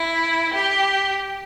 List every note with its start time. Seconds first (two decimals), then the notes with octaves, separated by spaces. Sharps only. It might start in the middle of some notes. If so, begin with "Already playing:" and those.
Already playing: E4
0.52 G4